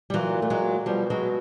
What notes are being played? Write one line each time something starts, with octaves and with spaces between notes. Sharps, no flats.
G3
A#2 E3 F#3
A3
F#3 G#3
B2 F3 G3
F#3 G#3